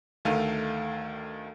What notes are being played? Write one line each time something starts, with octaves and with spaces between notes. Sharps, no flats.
D2 D#3 A3 A4 F5 D#7